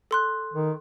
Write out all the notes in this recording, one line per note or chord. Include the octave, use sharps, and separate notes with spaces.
A4 C6 F#6
D#3